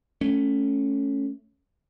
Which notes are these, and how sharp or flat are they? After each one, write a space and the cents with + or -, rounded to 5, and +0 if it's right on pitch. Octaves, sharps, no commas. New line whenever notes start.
A3 +0 C#4 +0